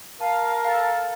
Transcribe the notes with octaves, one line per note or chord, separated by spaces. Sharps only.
A#4 F5 A5
A4 F5 A#5